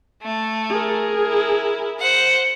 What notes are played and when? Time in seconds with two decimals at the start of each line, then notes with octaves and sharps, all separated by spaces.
0.22 A3
0.70 G#4 A#4
1.26 E4
1.99 C5 F#5